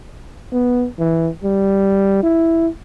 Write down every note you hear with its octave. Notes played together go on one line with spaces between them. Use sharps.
B3
E3
G3
E4